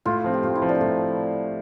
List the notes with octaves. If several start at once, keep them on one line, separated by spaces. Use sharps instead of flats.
A2 F4
F3 C4
G4
A2 F4
E4
F3 C4
D4
A#3
A2 A3